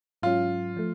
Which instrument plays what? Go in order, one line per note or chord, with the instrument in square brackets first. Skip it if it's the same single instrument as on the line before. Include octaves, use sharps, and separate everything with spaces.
[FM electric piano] G#2 F#3 C#4 [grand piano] F4
[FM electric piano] F3 A3